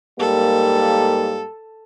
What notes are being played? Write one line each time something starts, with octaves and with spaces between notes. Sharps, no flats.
G#2 G3 A#3 A4